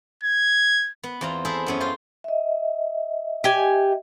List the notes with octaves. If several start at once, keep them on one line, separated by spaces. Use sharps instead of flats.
G#6
B3
E2 C4 F4 A#5
E4 G#4 A4 C5 E5
F#2 B3 C#4
F4 C5
D#5 E5
G4 G#5